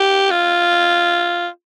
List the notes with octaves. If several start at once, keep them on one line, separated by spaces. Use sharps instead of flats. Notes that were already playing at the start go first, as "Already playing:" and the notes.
Already playing: G4
F4